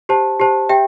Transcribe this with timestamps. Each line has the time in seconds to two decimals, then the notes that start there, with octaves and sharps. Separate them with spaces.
0.09 G4 C5 A5
0.40 G4 C5 A5
0.69 G4 E5 G5